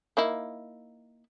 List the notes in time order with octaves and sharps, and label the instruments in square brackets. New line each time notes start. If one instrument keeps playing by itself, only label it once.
[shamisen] A#3 D#4 E4